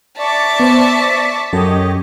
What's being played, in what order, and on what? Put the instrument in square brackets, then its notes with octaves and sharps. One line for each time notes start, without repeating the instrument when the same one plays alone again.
[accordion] D5 C#6 [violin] E5 A5
[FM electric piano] B3 C5
[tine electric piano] F#2 [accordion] G4 C#5 D#5 [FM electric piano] A4